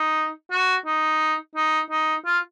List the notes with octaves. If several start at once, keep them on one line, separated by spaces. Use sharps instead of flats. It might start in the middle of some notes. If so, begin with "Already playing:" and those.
Already playing: D#4
F#4
D#4
D#4
D#4
F4